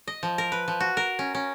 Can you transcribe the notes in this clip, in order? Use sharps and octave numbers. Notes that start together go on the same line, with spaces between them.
D#5
F3
A#4
B4
F3
F#4
A#4
C#4
C#4